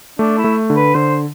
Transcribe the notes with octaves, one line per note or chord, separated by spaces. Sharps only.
A3 D4
E4
A3
D3
B4
D3 C5